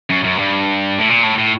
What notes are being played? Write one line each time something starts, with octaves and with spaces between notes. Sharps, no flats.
F#2
F#2
G2
A2
A#2
A2
A2